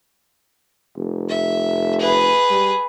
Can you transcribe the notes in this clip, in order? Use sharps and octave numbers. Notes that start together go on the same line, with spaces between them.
F1
E5
G#4 B4
G3